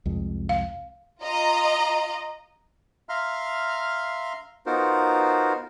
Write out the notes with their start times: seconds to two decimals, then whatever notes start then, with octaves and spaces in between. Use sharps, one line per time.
0.05 C2 F2 G#3
0.49 F5
1.22 F4 D#5 A#5
3.09 E5 F5 A#5 C6 F6
4.66 B3 D#4 F4 F#4 A#4 C5